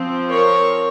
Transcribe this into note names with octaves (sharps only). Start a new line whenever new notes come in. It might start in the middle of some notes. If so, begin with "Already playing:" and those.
Already playing: F3 C4
A#4 C#5